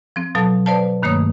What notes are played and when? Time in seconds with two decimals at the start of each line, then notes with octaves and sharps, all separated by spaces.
0.16 F3 C4
0.35 B2 F#3 A4 F5 A5
0.66 B4 C5 D5 F5 A5
1.03 G2 D#3 A3 A#3 C#5 D#6